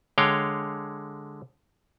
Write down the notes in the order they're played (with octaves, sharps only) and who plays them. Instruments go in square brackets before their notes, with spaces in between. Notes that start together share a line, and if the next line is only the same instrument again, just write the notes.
[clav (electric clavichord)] D3 G#3 C#5 F5 G5